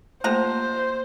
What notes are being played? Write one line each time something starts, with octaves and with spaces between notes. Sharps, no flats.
F3 A3 A#3 C5 F#5 A#5